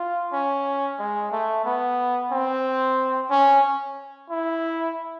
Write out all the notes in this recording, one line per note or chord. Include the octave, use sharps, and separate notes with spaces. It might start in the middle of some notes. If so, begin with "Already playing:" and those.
Already playing: F4
C#4
G#3
A3
B3
C4
C#4
E4